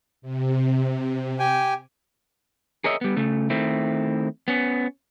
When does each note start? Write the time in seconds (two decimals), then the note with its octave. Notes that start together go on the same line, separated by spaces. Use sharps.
0.22 C3
1.39 G4 G5 G#5
2.84 G#4 A#4 C#5 D#5 E5
3.01 G3 B3
3.17 C#3 A3
3.50 D#3 A3 C4 E4
4.48 B3 C#4